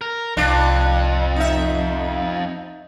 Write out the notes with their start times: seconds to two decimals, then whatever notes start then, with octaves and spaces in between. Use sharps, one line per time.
0.01 A#4
0.37 C2 F2 D4
1.36 D#4 E5